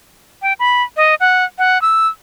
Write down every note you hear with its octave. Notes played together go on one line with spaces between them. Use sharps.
G5
B5
D#5
F#5
F#5
E6